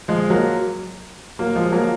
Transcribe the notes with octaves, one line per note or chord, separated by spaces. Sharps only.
F3 G#3
F#3 A#3
F#3 A#3
F3 G#3
F#3 A#3